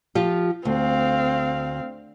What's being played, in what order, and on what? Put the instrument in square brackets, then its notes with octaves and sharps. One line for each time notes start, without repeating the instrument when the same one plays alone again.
[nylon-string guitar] F3 F4 G4
[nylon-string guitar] D2 [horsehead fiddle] C4 F5